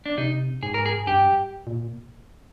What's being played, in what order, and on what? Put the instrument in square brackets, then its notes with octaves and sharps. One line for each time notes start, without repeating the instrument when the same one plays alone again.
[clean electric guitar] D4
[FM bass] C3 [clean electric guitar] D#4
[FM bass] G#2 [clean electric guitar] G#4
[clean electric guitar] A#4
G#4
[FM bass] G2 [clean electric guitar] G4
[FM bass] A#2